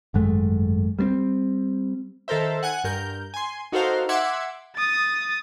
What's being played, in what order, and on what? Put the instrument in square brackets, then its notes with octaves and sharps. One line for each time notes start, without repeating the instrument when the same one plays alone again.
[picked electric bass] G#1 F#2 G#3 A3
G3 A3 C4
[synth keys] D#3 A4 A#4 C5 E5
F#5 G#5 F#6
G2 A#4 G6
G#5 C6
D#4 F#4 A4 A#4 C5 F5
E5 F#5 C6 D6 E6 G#6
[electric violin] D#6 A6